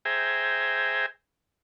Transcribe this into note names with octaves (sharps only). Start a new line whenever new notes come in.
G#4 C5 E5 G5 G#5 A#5